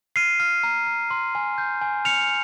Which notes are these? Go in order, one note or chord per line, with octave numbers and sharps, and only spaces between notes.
F6 C7 D#7
F6
A#5
A#5
C6
G#5
G6
G#5
F6 C#7 F7